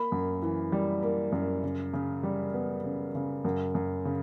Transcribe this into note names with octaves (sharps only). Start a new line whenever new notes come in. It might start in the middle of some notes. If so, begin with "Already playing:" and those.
Already playing: A#3 B5
F#2
E3
G3
A#3
F#2
C#3
C#3
G3
B3
C#3
C#3
F#2
F#2
C#3